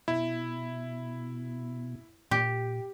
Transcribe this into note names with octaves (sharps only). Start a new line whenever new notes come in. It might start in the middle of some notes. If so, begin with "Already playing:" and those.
B2 E4
A#2 G4